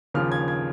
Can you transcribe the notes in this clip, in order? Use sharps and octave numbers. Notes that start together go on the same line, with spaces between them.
D#2 C#3 F3 F6
G#6
G#6